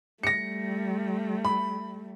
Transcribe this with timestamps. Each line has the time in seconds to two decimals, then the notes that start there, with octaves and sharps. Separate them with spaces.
0.23 G3 A3 A#6 C#7
1.45 B5